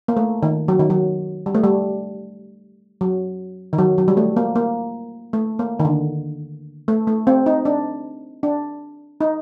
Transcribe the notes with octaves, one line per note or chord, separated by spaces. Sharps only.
A#3
A3
D#3
F#3
D#3
F#3
G3
A3
G3
F#3
D#3
F#3
F#3
G3
A3
A#3
A#3
A3
A#3
D#3
D3
A3
A3
C4
D#4
D4
D4
D#4